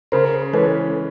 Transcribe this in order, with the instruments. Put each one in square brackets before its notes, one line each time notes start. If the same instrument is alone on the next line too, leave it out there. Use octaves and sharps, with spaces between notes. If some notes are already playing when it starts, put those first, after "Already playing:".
[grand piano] C#3 [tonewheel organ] A#4 C5
[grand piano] E3 G#3 C#4 [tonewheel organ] A4 B4